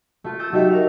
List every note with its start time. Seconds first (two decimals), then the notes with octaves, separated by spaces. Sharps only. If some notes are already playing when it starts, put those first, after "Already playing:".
0.24 A3 F4
0.39 D#6 E6 G6 A6
0.52 F#3 A3 D#4 G4 E5
0.70 A#4 F5 F6